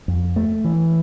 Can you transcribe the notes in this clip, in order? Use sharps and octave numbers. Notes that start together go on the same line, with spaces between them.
F2
A3
E3